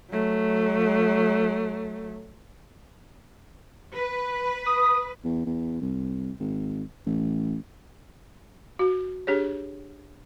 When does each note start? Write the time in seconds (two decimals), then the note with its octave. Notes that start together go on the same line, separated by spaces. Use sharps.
0.11 F#3 A3
3.95 B4
4.66 D#6
5.24 E2
5.46 E2
5.82 C2
6.40 G#1
7.07 A1
8.79 F#4
9.27 D4 G4 G#4 C#5